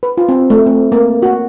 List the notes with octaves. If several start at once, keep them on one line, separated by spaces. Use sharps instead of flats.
B4
F4
C4
A3
C4
A#3
F#4